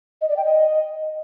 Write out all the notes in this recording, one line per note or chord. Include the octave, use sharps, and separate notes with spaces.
D#5
D5
G5
D#5